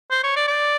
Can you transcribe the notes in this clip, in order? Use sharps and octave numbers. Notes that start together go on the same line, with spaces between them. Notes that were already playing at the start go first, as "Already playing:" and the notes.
C5
C#5
D5
D5